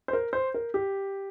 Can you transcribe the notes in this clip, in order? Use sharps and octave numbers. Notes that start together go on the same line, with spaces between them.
C5
A#4
C5
A#4
G4